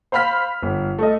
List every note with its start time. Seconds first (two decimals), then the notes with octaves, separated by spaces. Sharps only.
0.12 C5 F5 B5 F6 B6
0.63 G1
0.99 A3 A4 D#5